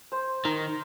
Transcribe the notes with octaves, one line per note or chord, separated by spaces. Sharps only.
C5
D#3 A#4